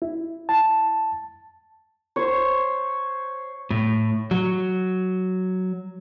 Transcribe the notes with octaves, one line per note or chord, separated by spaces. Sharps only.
E4
A5
C5 C#5
A2
F#3